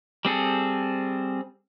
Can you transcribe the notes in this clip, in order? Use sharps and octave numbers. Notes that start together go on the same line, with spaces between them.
G3 C4 G#4 A4